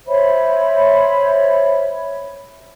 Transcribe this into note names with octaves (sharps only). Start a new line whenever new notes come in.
C5 C#5 E5 B5